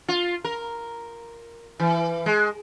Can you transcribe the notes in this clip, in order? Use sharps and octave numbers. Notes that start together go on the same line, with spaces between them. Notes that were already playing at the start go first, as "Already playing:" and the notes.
F4
A#4
E3
G#3